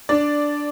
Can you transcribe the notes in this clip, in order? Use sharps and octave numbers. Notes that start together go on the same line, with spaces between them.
D4 D5